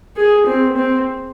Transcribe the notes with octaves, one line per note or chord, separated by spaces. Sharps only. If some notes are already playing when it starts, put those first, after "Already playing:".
G#4
C4
C4